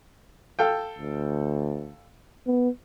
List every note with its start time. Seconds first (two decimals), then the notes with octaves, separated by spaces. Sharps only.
0.59 A4 F5 G5
0.98 D2
2.47 B3